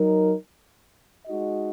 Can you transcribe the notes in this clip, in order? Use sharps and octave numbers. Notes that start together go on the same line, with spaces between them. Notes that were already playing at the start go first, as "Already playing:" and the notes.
Already playing: F#3 D#4 A#4
G#3 D#4 F#4 D#5